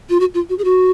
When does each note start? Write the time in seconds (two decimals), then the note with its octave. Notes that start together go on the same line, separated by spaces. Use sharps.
0.09 F4
0.20 F#4
0.34 F4
0.49 F#4
0.58 G#4
0.64 F#4